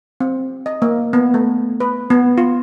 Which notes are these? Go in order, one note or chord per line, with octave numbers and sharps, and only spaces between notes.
C4
D#5
A#3
B3
A3
B4
B3
F4